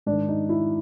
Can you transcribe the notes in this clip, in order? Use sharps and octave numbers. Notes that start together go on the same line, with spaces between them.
G#2 D#3 D4
D#4
E4